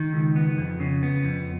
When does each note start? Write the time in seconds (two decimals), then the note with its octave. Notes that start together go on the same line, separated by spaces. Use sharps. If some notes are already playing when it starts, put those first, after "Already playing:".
Already playing: D#3
0.13 C#2
0.36 B3
0.58 F2
0.80 C#3
1.03 B3
1.24 F2